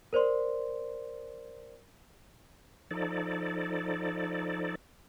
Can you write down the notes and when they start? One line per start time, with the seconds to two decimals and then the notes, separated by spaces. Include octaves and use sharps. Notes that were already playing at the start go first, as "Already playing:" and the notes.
0.13 A#4 C5 D5 C6
2.91 F3 D#4 A4 D5